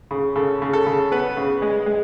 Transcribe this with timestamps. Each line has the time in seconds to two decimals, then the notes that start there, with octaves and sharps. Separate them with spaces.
0.11 C#3
0.36 C#3 A4
0.62 C#3
0.73 A4
0.87 C#3
1.12 B3 B4
1.37 C#3
1.62 G#3
1.86 G#3